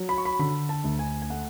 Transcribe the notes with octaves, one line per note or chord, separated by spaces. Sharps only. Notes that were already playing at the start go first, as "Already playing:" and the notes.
Already playing: F#3
B5
C#6
B5
D3 B5
A5
D2
G#5
G#5
A3 F#5